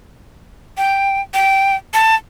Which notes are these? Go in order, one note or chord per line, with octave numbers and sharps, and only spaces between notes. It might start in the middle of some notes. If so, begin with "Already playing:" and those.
G5
G5
A5